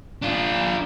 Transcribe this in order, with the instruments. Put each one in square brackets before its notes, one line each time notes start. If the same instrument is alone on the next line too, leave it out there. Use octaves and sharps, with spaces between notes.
[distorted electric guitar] D4 F4